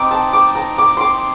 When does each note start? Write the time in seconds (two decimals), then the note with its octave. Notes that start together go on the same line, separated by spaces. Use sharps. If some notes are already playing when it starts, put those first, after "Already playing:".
Already playing: C4 D#4 D6
0.11 A5
0.33 D6
0.55 A#5
0.78 D6
0.97 C6 D6